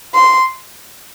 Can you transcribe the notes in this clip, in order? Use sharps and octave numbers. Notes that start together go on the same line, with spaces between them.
C6